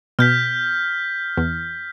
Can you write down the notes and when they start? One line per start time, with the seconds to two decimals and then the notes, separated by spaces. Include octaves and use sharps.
0.19 B2 F6 G6 B6
1.37 E2